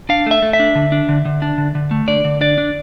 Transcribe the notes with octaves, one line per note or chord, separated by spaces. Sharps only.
D4 F5
A3 E5
A3
E5
D4
D3
D4
D3
D3
D4
D3
D3
A3
D3 D5
D3
D4 D5
D4